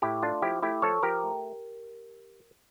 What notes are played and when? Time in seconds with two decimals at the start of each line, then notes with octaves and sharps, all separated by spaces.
0.02 A2 E4 G4
0.22 A3 D4 F4
0.42 F3 E4 G4
0.62 A3 E4 G4
0.82 F3 A4 C#5
1.03 F3 G4 A#4
1.23 A3